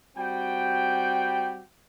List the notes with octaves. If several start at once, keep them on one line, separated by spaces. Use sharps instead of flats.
G3 C4 F#4 G5